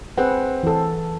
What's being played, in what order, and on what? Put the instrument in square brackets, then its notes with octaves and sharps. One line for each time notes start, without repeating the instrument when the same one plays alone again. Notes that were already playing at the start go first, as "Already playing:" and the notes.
[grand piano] C4 [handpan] G#4 B4 F#5
[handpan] E3 A4